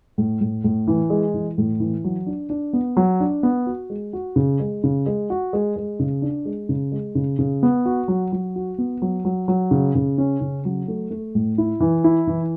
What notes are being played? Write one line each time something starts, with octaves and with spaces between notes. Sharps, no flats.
A2
A2
A2
E3
G#3
E3
A2
E3
F#3
D4
D4
B3
F#3
D4
B3
F#4
G#3
F#4
C#3
G#3
C#3
G#3
F#4
G#3
G#3
C#3
D4
G#3
C#3
G#3
C#3
C#3
B3
F#4
F#3
F#3
F#4
B3
F#3
F#3
F#3
C#3
C#3
C#4
C#3
F#3
A3
A3
A2
E4
E3
E4
E3